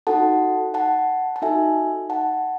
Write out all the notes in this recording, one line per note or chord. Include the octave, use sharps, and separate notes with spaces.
D#4 F#4 A4 F#5 A5
F#5 A5
A5
D#4 F#4 A4 E5 G#5
F#5 A5